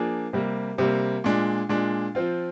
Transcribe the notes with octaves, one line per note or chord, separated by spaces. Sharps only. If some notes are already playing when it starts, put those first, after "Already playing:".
Already playing: F3 A#3 D4 G#4
C3 G3 A#3
C3 G3 A#3
A#2 G#3 D4
A#2 G#3 D4
F3 C4 F4